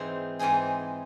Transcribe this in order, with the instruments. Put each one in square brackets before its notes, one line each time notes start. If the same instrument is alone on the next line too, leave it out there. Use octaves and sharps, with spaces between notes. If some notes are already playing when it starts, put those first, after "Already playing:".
Already playing: [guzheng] G#2 E3 C4 D#4 G#4
[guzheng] G#2 E3 C4 D#4 G#4 [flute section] G#5